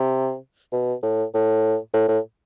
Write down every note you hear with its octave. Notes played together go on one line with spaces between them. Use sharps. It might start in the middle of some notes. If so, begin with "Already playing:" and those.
Already playing: C3
B2
A2
A2
A2
A2